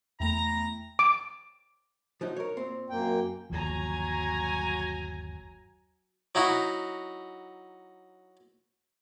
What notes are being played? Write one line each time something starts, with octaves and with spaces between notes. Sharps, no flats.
E2 A3 E4 G5 A#5
D6
F3 F#3 D#4
A#4 C#5
A#2 C4
F#2 A#3 G5
G1 D#2 F3 F#3 G#5 A#5
F#3 D#4 E4 F#4